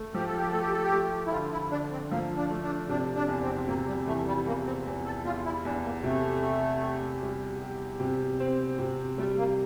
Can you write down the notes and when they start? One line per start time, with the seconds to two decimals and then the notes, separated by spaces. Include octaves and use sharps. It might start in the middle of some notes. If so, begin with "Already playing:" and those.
Already playing: A3
0.14 F3 G4
0.26 A4
0.37 G4
0.49 A3 A4
0.61 G4
0.72 A4
0.84 G4
0.93 A3
1.27 E4
1.32 D3 F4
1.52 E4
1.71 D3 D4
1.92 C4
2.11 F3 A#3
2.37 D4
2.50 A3
2.63 D4
2.89 C3 D4
3.16 D4
3.28 E2
3.42 C4
3.68 C3 A#3
3.88 G3
4.07 E3 A3
4.27 G3
4.46 E2 A#3
4.66 C4
4.87 E2
5.06 A4
5.25 E2 F4
5.45 E4
5.65 E2 D4
5.84 A#3
6.04 C3 A3
6.43 G4
6.83 G4
7.22 G3
7.62 G4
8.00 C3
8.40 C4
8.79 C3
9.18 G3 A3
9.38 A#3